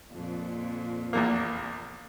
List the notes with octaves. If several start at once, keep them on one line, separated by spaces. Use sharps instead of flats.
F2 A#2
A#1 E2 A#3